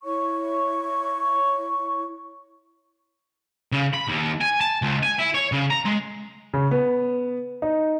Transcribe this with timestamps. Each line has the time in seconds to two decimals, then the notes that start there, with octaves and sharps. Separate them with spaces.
0.04 E4 C#5 C#6
3.72 C#3
3.93 B5
4.07 D#2
4.41 G#5
4.61 A5
4.82 C#2
5.03 G#5
5.18 E4
5.34 C#5
5.52 C#3
5.71 A#5
5.85 G#3
6.54 C#3
6.71 B3
7.62 D#4